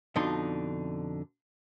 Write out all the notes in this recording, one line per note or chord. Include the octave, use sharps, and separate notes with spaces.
F2 B2 D3 D4 D#4 C6